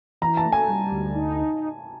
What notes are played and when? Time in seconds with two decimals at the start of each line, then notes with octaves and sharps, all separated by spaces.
0.21 E3 A#5
0.37 A5
0.45 A3
0.52 G#5
0.68 G3
0.91 D2
1.15 D#4